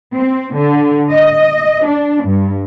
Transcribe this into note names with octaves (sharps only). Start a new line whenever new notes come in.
C4
D3
D#5
D4
G2